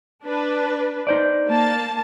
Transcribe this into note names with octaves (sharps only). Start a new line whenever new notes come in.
D4 B4
D#4 C5 D5
A#3 A5